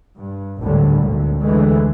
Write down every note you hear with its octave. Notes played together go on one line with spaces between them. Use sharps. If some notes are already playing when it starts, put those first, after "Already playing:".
G2
G#1 D2 A2 D3 F#3 G3
D2 A#2 D3
D2 D3 E3 G#3 A3